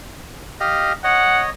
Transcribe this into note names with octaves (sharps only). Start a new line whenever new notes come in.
G4 D#5 F5
C#5 D#5 F#5